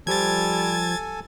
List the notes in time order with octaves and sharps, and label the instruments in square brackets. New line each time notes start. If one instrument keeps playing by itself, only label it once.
[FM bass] F3 [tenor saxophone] G3 [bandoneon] A4 G#5 A5 [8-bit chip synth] G#6 A6